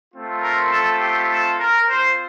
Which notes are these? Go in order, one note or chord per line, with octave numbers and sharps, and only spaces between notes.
A3 C4 F4
A#4
A4
G4
A4
A#4
C4 F4 C5